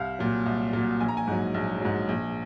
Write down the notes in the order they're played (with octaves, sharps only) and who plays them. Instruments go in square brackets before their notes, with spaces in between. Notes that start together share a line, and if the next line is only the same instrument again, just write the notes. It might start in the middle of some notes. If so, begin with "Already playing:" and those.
Already playing: [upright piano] C2 F5
A#2 F#3
C2
A#2 F#3
A#1 G#5
A#5
G#5
G#2 F#3
A#1
G#2 F#3
A#1